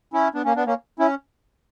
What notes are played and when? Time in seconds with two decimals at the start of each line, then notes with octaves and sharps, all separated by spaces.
0.13 C#4 E4
0.34 B3 D4
0.45 A#3 C#4
0.56 B3 D4
0.66 A#3 C#4
0.99 C#4 E4